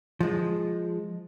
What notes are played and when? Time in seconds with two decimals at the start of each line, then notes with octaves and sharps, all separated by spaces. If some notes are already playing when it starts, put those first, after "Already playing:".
0.20 F3 G#3